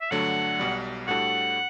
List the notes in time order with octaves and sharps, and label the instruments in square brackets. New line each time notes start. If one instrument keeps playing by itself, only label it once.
[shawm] E5
[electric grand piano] G2 D3 F#3 A3 D4 [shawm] F#5
[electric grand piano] B1 B2 G3
[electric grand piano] A2 G3 D4 F#4 A4 [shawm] F#5